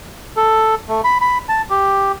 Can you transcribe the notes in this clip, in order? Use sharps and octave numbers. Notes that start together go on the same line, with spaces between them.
A4
A3
B5
B5
A5
G4